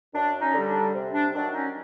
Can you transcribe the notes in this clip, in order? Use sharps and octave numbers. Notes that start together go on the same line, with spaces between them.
F#2 D4
C#4 D#4
D3 G3
D4
C3
D4
D#3 F#3 D4
C#4 D#4